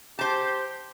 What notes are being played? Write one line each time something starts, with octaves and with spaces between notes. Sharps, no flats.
G4 C5 A5